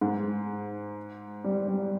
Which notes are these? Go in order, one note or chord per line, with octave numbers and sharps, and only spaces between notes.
G#2
G3
G3